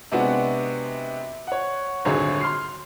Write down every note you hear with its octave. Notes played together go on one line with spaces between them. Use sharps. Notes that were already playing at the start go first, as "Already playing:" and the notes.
C3 G#3 B3 D4 F#4
C#5 F#5
D#1 G#1 D3 F#3 G#4 C#5
C6 F6 C7